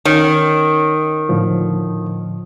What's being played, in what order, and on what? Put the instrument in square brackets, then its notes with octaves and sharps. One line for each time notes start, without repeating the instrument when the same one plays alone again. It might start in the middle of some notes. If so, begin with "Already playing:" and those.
[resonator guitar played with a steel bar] D#3 [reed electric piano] C#4 C#5
[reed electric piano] A2 D3 F3